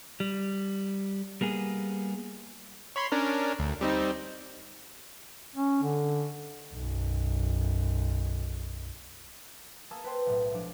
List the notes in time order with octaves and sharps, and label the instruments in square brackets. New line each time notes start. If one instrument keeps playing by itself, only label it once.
[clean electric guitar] G3
G3 A#3 B3 G#4
[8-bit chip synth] C#5 B5 C6
C#4 D4 A#4
D2
G3 C4 D#4
[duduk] C#4
D3
[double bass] B1 F#2
[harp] A#3 G#4 A5 D#6 E6
B4 C5 G5 C6
B1 A2
F3 G#3 D4